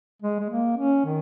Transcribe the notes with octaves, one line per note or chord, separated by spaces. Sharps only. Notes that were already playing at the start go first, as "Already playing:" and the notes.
G#3
G#3
A#3
C#4
D#3